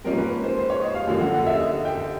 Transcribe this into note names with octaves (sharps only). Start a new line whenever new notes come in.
G#2 F3 A#3 C#4 A#4
B4
C5
C5
C#5
D#5
F5
F#2 D3 F3 A#3
F#5
F#5
E5
D#5
G5